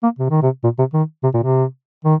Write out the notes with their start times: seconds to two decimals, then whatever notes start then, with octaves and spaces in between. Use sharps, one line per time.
0.03 A#3
0.19 C3
0.30 D#3
0.42 C3
0.64 A#2
0.79 C3
0.93 D#3
1.24 C3
1.34 A#2
1.43 C3
2.05 D#3